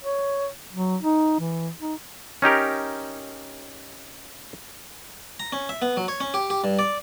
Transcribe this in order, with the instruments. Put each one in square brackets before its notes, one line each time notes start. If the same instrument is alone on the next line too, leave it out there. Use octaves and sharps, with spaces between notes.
[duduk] C#5
F#3
D#4
E3
D#4
[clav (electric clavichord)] C#4 D#4 G4 A#4
[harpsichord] A#5
C#4
E5
B3
F#3
C#5
C#4
G4
G4
G2
D5